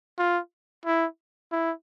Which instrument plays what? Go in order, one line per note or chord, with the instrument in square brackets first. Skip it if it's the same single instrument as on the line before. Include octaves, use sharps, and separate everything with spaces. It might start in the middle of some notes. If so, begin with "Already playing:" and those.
[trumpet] F4
E4
E4